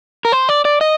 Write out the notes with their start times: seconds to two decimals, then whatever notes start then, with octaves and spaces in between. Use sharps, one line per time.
0.25 A#4
0.32 C5
0.49 D5
0.65 D5
0.81 D#5